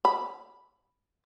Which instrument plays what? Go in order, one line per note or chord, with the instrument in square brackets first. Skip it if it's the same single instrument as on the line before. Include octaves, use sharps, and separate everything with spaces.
[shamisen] B5